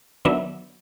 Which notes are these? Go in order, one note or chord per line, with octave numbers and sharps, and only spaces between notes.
D#3 F#3 B3 D4 E5